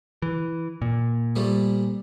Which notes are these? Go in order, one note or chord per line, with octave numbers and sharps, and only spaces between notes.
E3
A#2
F3 G3 A3